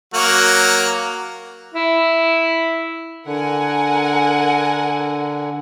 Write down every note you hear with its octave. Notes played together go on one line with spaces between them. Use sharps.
F#3 A#3 F#4
E4
D3 A#4 F#5 G#5